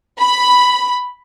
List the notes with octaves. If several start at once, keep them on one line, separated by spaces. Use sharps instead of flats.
B5